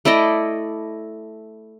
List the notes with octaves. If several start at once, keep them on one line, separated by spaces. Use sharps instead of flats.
A3 E4 D5 D#5